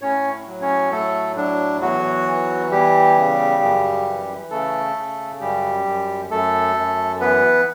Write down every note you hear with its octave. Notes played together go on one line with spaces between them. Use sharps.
A2 C#4 C#5
F#3
C#4 C#5
A2 A3 A4
F#3 D4
E2 F#3 F#4
E3
E2 G3 G4
C#3
F#2
E3
C#3 A3 A4
C#3
F#2 G3 G4
F#2
F#2 A3 A4
F#2
E3 B3 B4